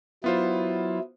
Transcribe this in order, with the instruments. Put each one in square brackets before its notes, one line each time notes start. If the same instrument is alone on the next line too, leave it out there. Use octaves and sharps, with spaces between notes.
[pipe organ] F#3 E4 [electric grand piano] B3 F4 C5